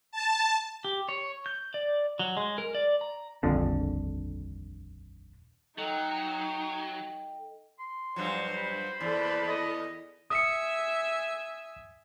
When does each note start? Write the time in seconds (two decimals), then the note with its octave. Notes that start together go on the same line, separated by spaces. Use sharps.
0.12 A5
0.85 G4
1.09 C#5
1.46 G6
1.74 D5
2.19 F#3
2.37 G#3
2.58 A#4
2.75 D5
3.01 A#5
3.43 D#1 A#1 F2 D3
5.78 F#3 D#4 A4 D#5 G5
7.79 C6
8.16 G2 F3 F#3 C5
8.56 B5
9.00 E2 A4 D5
9.47 D#5
10.30 E5 G#5 D#6 C#7